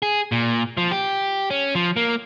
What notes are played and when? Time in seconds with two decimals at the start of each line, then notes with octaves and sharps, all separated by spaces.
0.02 G#4
0.32 A#2
0.77 F3
0.92 G4
1.50 C#4
1.75 F3
1.96 A#3